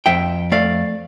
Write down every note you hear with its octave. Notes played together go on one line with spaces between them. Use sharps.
F2 E5 G5
A3 D5 F5